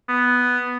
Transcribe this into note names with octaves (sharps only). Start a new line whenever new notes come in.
B3